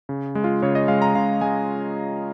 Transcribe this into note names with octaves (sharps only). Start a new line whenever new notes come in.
C#3
G#3
F4
C#3 C#5
D#5
G#3 F5
A#5
C#3 F5
G#3 G#5